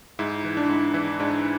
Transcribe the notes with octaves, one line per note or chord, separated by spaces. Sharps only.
G#2 E4
E3
D4
G#2
E3 E4
G#2 D4